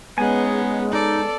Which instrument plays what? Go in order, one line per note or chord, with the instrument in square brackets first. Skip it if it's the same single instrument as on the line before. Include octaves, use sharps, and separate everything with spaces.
[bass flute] G#3 [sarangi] B3 [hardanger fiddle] C#4 D#4 [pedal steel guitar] G#4 G#5
[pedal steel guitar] D#4 [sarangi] A4 [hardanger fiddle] D5